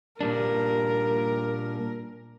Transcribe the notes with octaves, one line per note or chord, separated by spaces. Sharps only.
A#2 G3 D4 A#4